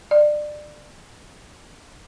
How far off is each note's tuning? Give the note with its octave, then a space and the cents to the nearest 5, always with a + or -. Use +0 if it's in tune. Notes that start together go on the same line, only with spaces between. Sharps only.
D5 +25